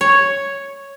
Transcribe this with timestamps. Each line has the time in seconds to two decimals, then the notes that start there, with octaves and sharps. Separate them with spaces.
0.01 C#5